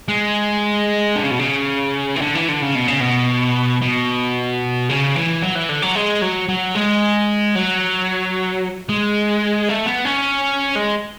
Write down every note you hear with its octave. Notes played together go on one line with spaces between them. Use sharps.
G#3
D3
C#3
B2
C#3
E3
D3
E3
D3
C#3
B2
C#3
B2
B2
C#3
E3
F#3
E3
D3
F#3
G#3
F#3
F#3
G#3
F#3
G#3
A3
B3
C#4
G#3